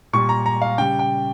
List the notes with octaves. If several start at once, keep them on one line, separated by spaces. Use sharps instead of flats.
A#2 G3 C#6
A#5
A#5
F5
C#3 G3 G5
G5